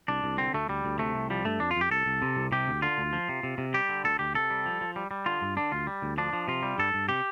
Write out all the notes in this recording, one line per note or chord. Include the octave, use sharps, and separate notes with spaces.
C2 D4
C2
D3 C4
D2 A3
D2 G3
D2
C3 A3
C2
F3 G3
G2 A3
F2 D4
F4
F2 G4
C2 A4
C2
C3
C2
C3 G4
D2
D3 F4
D2
F3
C3
C3
C3
G3 G4
D3
D2 A4
D2 G4
C3 A4
G3
F3
F3
G3
G3
D3 F4
G2
D3 D4
D2 F4
G3
D2
F3 D4
F3
C3 F4
G3
G2 A4
G2
C3 G4